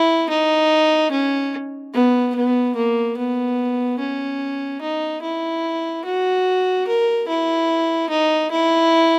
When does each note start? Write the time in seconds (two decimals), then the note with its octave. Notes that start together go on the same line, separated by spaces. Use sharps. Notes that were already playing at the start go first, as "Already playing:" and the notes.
Already playing: E4
0.29 D#4
1.11 C#4
1.94 B3
2.35 B3
2.75 A#3
3.17 B3
3.99 C#4
4.81 D#4
5.22 E4
6.05 F#4
6.87 A#4
7.28 E4
8.10 D#4
8.51 E4